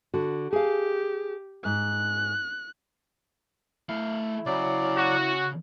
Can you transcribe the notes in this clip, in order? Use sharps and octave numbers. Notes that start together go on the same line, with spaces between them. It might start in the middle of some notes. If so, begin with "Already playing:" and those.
D3 F#4
G4 G#4 F5
G#2 F#6
A3 E4 F5
C#3 F#3 D5
F#4